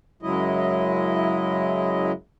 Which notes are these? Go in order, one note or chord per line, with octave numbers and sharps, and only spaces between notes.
F#2 C#3 F#3 G#3 E4 D#5